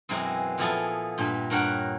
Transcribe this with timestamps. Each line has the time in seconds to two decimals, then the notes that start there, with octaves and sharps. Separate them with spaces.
0.09 F#2 B2 E3 G#3 C4
0.58 A#2 F3 B3 E4 G#4 A4
1.18 G2 A#2
1.50 G2 A#4 C#5 F#5 G5